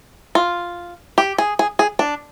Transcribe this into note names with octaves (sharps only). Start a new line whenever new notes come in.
F4
G4
G#4
G#4
G#4
D4